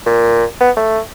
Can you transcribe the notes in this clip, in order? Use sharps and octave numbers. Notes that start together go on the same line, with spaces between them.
A#2
B3
A3